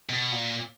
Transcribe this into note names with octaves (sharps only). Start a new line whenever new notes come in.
B2
A#2